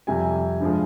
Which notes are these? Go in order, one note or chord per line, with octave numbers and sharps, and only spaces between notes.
F2 C3 G3 G#5
G2 F3 G#3